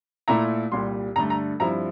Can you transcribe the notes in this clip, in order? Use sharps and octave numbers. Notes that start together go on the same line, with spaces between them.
A#2 A3 E4 A#5
C2 A#2 G3 C6
G2 D3 A3 A#5
A#5
G2 F3 C4 E4 A#5